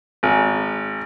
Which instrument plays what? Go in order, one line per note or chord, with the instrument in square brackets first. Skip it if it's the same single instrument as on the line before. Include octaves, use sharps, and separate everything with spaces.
[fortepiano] G#1